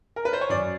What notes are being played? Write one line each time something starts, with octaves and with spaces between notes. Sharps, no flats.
A#4
B4
C5
C#5
F#2 D5